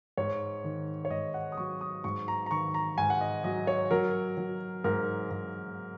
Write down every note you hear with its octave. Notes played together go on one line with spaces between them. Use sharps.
G#2 C#5
D#3
C#5
G#2 D#5
F#5
D#6
F#3 C#6
D#6
G#2 C#6
A#5
A#5
D#3 C#6
A#5
G#2 G#5
F#5
D#5
F#3 D#5
C#5
F#3 A#4
F#3
G#2 A#4
G#2